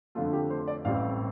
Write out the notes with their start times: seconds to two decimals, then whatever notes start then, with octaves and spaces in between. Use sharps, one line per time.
0.15 F2 D3 F3 A3 F4
0.33 G4
0.50 C5
0.68 D5
0.85 A1 A2 G3 C4 F5